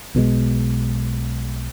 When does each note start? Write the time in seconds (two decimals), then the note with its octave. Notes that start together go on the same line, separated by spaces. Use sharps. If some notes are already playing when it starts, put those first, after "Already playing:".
0.14 B1 B2 D3 G#3